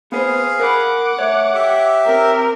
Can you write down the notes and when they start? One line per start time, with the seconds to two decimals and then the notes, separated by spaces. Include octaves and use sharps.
0.12 B3 G#4 B4 C5 F5
0.60 A#4 F#5 B5 D6
1.19 A3 C#5
1.55 G4 E5
2.06 C4 A#4